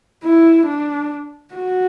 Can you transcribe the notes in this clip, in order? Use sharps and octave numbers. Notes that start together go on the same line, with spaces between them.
E4
D4
F#4